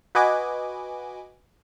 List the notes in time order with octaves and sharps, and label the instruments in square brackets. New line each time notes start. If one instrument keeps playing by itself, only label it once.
[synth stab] F#4 B4 D#5 G#5 D6